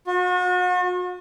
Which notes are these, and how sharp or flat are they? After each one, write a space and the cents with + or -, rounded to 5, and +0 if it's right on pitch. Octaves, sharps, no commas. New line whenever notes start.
F#4 -40